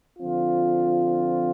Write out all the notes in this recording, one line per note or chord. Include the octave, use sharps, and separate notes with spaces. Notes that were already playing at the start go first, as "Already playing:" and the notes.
D3 F3 C4 F4